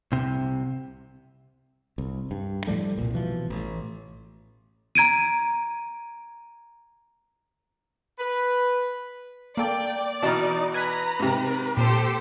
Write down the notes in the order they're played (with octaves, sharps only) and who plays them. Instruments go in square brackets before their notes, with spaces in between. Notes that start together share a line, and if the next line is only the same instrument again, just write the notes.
[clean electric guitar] C2 C3
[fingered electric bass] C2
G2
A2 F3 G3 A3
C2 A#2
B2 E3 F3
A1
[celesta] A#5 G#6 D7 D#7
[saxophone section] B4
[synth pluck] A#3 A4 [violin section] D5 [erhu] G5
[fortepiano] B2 E3 [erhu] D#4 [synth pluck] A5 F6
[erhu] B4 [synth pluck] G#5 F#6 B6 [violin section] A#5
[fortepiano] G#2 C3
[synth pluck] A#2 [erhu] G4 [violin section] A4 C5